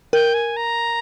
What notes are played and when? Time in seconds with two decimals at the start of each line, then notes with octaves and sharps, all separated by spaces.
0.13 A#4 G5
0.34 G#5
0.57 A#5